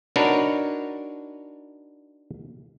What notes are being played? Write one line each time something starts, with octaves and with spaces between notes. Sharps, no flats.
D4 D#4 F#4 A#4 B4 C#5